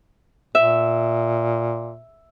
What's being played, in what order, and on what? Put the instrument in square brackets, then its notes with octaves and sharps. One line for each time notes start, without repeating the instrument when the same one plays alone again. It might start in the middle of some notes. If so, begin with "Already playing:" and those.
[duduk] A#2 [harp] E5